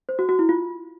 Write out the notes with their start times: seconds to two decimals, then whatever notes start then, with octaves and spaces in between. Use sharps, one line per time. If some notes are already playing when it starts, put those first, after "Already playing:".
0.09 C5
0.19 F#4
0.29 F#4
0.39 E4
0.49 F4